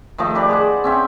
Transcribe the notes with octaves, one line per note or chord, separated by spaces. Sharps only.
D#3 F3 A3 D#5
G4 B4 D5
G#4 C5 F#5
C4 C#4 E5 G5